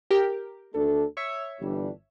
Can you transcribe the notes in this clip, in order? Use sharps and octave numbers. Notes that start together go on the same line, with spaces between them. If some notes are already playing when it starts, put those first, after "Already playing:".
G4 A#4
D2 D3 A3 D4 A4
C#5 E5
G1 G2 E3 G3 D4